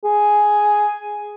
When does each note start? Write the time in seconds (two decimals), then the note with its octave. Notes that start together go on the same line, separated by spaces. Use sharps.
0.04 G#4